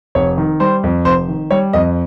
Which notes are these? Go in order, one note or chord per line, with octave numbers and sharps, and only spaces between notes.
F1 C#5
D#3
G3 C5
F2
F1 C5
D#3
G3 C#5
F2 D#5